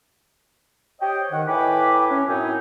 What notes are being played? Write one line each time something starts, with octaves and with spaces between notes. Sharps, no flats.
G4 C5 C#5 D#5 G5
D#3 F#5
A2 B4 G5 G#5 B5 D6
C#4
F#2 A2 C4 D#4 G#5